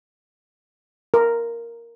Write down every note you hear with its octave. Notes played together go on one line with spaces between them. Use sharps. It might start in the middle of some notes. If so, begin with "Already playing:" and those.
A#4